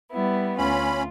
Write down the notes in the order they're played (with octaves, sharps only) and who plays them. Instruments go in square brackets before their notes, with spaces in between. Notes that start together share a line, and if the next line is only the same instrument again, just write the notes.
[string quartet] G3 B3 E4
[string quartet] D2 F4 [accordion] C#4 B5